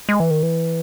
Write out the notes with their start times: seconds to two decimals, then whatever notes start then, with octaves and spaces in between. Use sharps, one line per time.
0.09 G#3
0.20 E3
0.31 D#3
0.43 E3